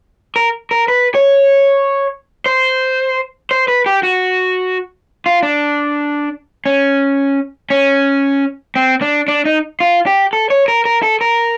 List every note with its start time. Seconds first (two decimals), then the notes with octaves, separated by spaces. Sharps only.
0.36 A#4
0.71 A#4
0.88 B4
1.15 C#5
2.46 C5
3.51 C5
3.68 B4
3.86 G4
4.03 F#4
5.26 F4
5.43 D4
6.66 C#4
7.70 C#4
8.76 C4
9.01 D4
9.28 D4
9.45 D#4
9.80 F4
10.06 G4
10.33 A4
10.50 C#5
10.68 A#4
10.85 A#4
11.03 A4
11.21 A#4